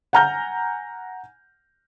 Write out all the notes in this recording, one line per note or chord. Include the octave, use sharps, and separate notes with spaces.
F#5 G#5 A#5 F6 G6